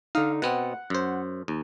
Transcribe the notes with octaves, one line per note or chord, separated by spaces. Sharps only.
D3 D#4 F5
B2 B3 C4 F#5
F#2 C5
D#2